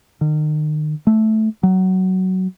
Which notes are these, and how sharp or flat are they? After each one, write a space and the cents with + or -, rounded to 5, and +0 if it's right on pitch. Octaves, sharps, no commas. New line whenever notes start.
D#3 -35
A3 -10
F#3 +15